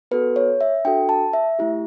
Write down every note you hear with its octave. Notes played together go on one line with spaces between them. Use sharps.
B3 F#4 A4 B4
C#5
E5
D4 F#4 A4 G5
A5
E5
A3 E4 G4